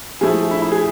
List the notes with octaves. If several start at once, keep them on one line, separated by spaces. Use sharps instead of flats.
F3 A3 E4 G#4 G#5
E4 E5
E4 E5
G#4 G#5